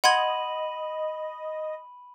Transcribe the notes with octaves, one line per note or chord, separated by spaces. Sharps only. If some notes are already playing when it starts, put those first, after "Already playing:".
D#5 F#5 B5 C6 G#6 D#7 F#7